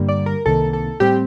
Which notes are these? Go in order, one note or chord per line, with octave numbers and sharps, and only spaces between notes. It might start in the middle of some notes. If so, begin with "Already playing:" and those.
Already playing: G2 D3 G3 A#3
D5
A#4
C2 C3 D#3 A#3 A4
A4
A2 G3 C4 G4